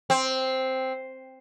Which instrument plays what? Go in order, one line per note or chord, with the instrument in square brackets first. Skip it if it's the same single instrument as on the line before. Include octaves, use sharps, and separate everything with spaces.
[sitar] C4